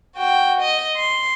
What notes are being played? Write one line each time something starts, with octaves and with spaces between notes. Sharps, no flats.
F#4 G5
D#5
C6